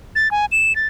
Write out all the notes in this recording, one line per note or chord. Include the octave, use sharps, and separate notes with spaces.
A6
G#5
E7
A6